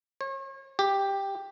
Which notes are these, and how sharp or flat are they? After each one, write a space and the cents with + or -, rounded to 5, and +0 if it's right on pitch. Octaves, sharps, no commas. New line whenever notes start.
C#5 -40
G4 +5